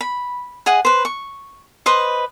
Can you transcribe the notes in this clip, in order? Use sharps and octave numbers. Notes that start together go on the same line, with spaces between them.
B5
G#4 D#5 F#5 G#5
B4 C5
C#6
B4 C5 D#5